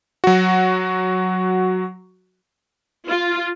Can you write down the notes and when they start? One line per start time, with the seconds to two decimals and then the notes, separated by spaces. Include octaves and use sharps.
0.24 F#3 F#4
3.08 F4